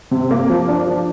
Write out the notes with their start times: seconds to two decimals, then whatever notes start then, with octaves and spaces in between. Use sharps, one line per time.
0.11 C3
0.31 A#3
0.50 F3
0.68 D4
0.87 F3